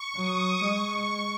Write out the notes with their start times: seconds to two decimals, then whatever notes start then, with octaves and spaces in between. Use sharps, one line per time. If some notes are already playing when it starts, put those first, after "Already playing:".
Already playing: C#6
0.16 F#3 D#6
0.64 G#3 C#6